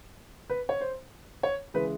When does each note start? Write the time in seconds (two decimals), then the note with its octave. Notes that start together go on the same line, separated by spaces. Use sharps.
0.50 B4
0.69 C#5
0.81 C5
1.43 C#5
1.74 C#3 E3 G#3 B4